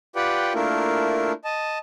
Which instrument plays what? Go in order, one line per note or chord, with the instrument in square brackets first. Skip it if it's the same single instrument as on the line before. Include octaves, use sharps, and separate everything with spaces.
[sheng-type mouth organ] F4 G4 B4 D5 F#5 G5
A3 A#3 D4 E4 F4 A#4
D#5 A5